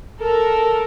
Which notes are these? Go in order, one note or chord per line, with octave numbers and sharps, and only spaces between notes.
A4 A#4